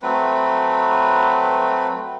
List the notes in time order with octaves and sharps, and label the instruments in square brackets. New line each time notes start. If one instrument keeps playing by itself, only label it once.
[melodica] F#3 A3 C4 B4